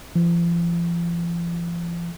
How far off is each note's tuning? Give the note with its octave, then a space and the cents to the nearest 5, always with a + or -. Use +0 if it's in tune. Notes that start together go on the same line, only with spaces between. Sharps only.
F3 -40